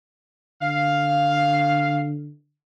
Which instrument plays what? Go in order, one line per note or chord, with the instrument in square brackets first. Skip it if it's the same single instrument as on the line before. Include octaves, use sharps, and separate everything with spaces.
[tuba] D3 [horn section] F5